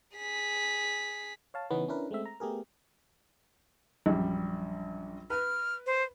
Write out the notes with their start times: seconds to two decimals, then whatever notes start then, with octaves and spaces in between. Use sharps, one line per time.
0.16 G#4 B6
1.54 C#5 F5 A5
1.70 C#3 E3 B3 C#4 D#4 B4
1.88 C#4 D4 E4 A#4 B4
2.11 G#3 A3 C4 E5
2.26 A#5
2.40 A3 B3 G4 G#4 A#4
4.06 A#1 F#2 G3
5.30 B4 F6
5.87 C5